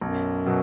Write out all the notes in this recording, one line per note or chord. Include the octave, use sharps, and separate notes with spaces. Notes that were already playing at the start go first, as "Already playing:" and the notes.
B1 F#2
B2 F#3